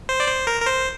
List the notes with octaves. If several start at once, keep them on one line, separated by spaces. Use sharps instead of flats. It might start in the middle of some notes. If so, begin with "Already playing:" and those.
C5
D5
C5
A#4
A#4
C5